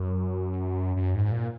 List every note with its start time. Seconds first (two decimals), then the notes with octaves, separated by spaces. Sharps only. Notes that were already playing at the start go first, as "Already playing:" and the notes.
Already playing: F#2
0.96 F#2
1.15 G#2
1.32 A#2